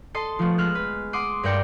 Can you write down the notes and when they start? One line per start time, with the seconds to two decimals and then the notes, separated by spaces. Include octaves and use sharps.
0.14 A4 D#5 A5 C6
0.39 F3 A3 B3
0.58 G#3 F6 F#6
0.75 B4
1.13 F#5 C6 D6 D#6
1.43 G2 A#4 D5 G5 C#7